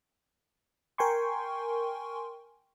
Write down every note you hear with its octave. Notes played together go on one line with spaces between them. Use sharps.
A#4 G5 G#5 C6 C#6